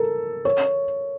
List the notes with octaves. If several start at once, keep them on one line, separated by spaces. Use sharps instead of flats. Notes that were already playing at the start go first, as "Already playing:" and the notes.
Already playing: A4 A#4
C#5